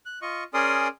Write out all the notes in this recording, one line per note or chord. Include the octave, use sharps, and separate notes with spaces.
F#6
F4 D#5 C#6
C#4 G#4 A#4 D5 C6 D#6